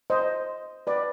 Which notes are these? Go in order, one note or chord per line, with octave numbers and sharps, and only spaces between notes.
C5 D#5
B4 D5